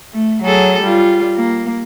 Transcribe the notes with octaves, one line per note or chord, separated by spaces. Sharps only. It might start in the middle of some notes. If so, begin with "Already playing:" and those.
A3
F#3 G#4 A4
G3 F4
A#3